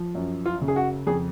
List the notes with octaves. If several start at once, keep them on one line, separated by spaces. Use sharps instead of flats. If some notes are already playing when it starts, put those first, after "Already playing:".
Already playing: F3
F#2
F4
C#3
G#4
F#4
F2 G#4